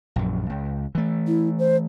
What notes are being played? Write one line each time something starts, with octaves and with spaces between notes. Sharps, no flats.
A#1 F#2
C#2
E3 A3
E4
C5